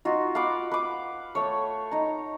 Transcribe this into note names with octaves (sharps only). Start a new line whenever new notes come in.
D#4 F4 F#4
F5 F#5 B5 D6
B4 D6
A3 C#5
D#4 A#5